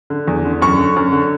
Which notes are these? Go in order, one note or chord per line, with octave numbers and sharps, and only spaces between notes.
D3
E2
D3
F#2 C#6
D3
F#2
D3